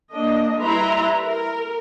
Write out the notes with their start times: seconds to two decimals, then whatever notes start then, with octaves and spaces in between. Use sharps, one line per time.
0.12 A#3 D4 D#5
0.60 G3 E4 B4 E5 A#5 C6
1.22 A#4